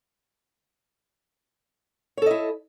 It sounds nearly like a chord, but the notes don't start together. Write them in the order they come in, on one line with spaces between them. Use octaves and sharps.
C#5 A4 D#5 E4